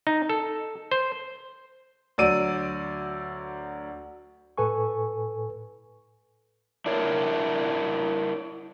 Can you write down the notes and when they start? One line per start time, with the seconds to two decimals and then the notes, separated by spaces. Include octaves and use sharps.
0.07 D#4
0.29 A4
0.91 C5
2.18 D2 F#3 D5 E6 D7 D#7
4.58 A2 A4 B4 G#5 C#6
6.86 D4 E4 A#4 C#5 D5